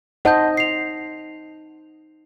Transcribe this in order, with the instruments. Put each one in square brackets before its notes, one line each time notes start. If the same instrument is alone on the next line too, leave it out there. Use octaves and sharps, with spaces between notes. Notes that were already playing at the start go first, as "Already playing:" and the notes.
[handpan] D#4 C5 D#5 [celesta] F#5 A5 G6
[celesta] C7 F7